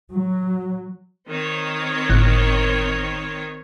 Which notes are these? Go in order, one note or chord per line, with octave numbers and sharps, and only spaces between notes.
F#3
D#3 C4 C#5
G1 A2 F#6